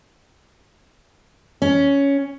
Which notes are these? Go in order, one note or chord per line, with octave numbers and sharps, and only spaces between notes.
C#4